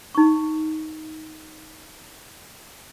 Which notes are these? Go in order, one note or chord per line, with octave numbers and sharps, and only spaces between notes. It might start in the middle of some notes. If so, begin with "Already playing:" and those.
D#4 C#6